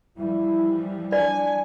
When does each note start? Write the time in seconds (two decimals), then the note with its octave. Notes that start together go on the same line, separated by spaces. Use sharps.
0.18 E3 F3 G3 E4
1.12 D4 D5 G#5